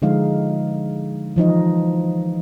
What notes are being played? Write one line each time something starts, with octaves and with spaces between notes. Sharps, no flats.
D3 F3 G#3 D#4 F5
E3 F3 D#4 D#5